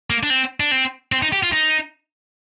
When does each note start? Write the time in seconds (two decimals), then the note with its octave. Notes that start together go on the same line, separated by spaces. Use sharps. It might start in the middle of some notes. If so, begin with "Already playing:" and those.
0.10 A#3
0.23 D4
0.30 C4
0.60 D4
0.71 C4
1.12 C4
1.23 D#4
1.33 G4
1.43 F4
1.53 D#4